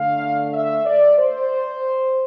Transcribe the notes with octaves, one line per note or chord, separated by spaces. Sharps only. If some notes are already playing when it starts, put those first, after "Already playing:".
Already playing: D3 A3 F5
E5
D5
C5